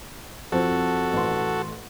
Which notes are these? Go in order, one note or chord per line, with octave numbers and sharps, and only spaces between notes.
F2 C4 F#4 A4
A1 C6